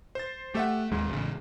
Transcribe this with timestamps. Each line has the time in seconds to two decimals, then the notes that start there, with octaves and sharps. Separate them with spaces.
0.15 C5 A6
0.55 A3 G4 E5 F#5
0.92 D#2 G#2 G#3
1.08 A1 C#3